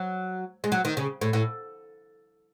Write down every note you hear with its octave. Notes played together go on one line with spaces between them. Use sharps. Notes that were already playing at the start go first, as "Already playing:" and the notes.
Already playing: F#3
G#3
F#3
D#3
C#3
A2
A2